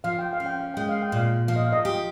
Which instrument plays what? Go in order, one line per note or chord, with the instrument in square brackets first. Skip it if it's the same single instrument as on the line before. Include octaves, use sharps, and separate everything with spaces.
[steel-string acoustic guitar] F3 [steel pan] F5
[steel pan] G5
F5
[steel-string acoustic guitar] C#4
[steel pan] G5
F5
[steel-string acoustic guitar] G#3 [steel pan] G5
[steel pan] F5
G5
[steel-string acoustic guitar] A#2 [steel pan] F5
[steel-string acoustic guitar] F3 [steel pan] F5
[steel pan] D#5
F5
D#5
[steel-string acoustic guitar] G4